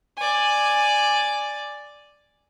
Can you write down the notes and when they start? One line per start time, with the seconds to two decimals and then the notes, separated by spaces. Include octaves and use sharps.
0.18 D5 G#5